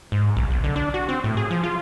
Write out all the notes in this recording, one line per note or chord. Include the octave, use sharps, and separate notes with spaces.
G#2
B1
B1
D3
D4
F#4
C4
A2
G#4
F3
F4